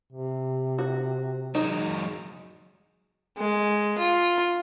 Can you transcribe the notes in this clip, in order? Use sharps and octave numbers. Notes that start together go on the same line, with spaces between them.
C3
F#4
F#3 G#3 D#4
G#3
F4